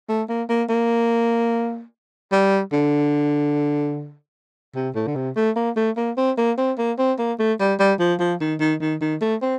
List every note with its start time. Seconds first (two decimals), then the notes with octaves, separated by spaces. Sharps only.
0.09 A3
0.29 A#3
0.49 A#3
0.69 A#3
2.32 G3
2.73 D3
4.75 C3
4.95 A2
5.07 D3
5.16 C3
5.36 A3
5.56 A#3
5.76 A3
5.97 A#3
6.17 C4
6.38 A#3
6.58 C4
6.78 A#3
6.99 C4
7.19 A#3
7.39 A3
7.60 G3
7.80 G3
8.00 F3
8.20 F3
8.41 D#3
8.60 D#3
8.81 D#3
9.01 D#3
9.21 A3
9.42 C4